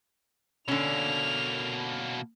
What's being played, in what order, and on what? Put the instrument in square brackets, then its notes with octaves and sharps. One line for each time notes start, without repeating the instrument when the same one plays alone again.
[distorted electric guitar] B2 A#3 [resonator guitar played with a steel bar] D3 C#4 [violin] F7